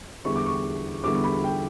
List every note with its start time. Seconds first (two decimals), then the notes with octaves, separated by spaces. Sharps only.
0.25 E2 D3 G3 B3 E4 C#6
0.36 D6
0.46 C#6
1.04 E2 D3 G3 B3 E4 D6
1.24 B5
1.44 G5